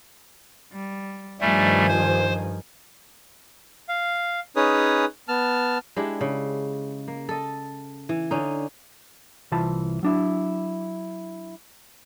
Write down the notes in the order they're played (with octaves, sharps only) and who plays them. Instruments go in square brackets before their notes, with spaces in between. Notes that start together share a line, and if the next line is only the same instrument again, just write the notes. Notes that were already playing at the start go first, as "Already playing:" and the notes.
[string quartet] G3
[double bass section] G2 D#3 F3 [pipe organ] G3 A3 [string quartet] G#5
[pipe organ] C5
[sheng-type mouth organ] F5
C#4 D#4 G#4 B4 C#5 D#6
B3 A5 F6
[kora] G#3 D4 E4 G4
C#3
A#3
A4 D#5
E3
D3 C#4 D#4
[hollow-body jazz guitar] C2 E3 F4 C5 A5 B5
F#3 D4 E4